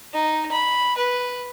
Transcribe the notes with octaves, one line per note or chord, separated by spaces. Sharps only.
D#4
B5
B4